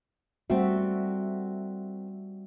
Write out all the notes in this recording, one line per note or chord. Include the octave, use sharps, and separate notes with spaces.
G3 A3 C4 F#4 E5